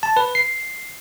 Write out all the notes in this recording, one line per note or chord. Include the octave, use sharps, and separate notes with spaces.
A5
B4
C7